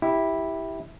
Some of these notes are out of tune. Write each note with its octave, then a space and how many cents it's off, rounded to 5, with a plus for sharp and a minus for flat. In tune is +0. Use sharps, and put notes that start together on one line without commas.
E4 -10 G4 +0